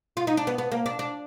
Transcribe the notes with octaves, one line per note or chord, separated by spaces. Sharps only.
F4
D#4
D4
B3
B3
A#3
D4
D4